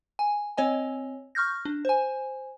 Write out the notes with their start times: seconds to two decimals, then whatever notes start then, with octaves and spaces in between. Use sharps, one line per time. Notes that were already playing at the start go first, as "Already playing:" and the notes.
0.19 G#5
0.57 C4 C#5 D#5 G#5
1.35 C#6 F6 G6 A#6
1.65 D4
1.85 C5 G#5